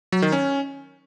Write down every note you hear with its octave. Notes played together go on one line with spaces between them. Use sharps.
F#3
D#3
C#4